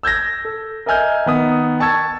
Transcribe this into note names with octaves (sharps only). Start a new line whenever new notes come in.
E6 G6 G#6 A#6
A4
A#4 D#5 E5 G#5 F6 G6
D#3 B3 D#6
G5 A5 C#6 E6 G#6 A6